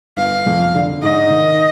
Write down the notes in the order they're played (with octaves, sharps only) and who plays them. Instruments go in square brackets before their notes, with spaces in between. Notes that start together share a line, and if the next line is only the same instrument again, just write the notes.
[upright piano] G1 [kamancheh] F5
[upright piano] F2
D3
[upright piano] G#2 [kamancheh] D#5
[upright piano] D#3